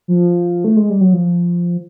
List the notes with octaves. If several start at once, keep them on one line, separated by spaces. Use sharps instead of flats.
F3
A3
G#3
G3
F#3
F3